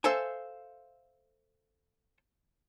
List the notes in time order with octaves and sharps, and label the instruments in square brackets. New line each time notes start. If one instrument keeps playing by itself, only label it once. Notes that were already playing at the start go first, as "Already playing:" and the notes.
[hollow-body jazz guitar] A4 C5 E5 F5 G#5